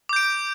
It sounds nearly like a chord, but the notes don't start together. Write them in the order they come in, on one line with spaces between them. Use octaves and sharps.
D6 G6 D7